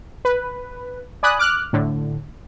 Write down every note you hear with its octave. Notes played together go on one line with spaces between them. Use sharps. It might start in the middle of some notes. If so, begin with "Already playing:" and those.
B4
D5 G#5 B5 D#6 F#6
D6 F6 F#6
A2 D3